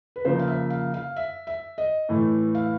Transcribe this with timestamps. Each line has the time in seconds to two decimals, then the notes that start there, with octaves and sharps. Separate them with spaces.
0.16 B4
0.25 C#3 F3 A#3 C5
0.39 F5
0.48 E5
0.70 F5
0.94 F5
1.16 E5
1.47 E5
1.78 D#5
2.09 A2 E3 A3
2.55 F5